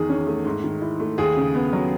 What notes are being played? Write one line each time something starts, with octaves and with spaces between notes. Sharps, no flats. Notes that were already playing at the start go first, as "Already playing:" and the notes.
Already playing: E2 D#3 G#4
C#4
A3
G#2
D#3
E4
A3
D#2 G#4
C#3
B3
F#3